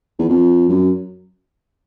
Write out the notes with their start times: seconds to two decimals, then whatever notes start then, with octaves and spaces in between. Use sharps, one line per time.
0.19 E2
0.29 F2
0.69 F#2